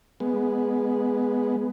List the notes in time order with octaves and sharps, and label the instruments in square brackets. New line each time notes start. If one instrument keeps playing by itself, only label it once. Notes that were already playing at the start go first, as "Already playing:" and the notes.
[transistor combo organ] G#3 B3